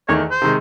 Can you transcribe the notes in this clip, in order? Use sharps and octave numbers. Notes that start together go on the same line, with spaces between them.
E2 D#3 A3 C#5
C5
C3 D#3 G#3